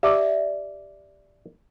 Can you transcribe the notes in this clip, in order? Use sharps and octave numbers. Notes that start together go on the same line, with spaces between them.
G4 D5 E5